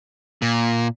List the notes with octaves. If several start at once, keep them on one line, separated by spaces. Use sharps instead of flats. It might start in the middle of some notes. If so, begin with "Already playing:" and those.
A#2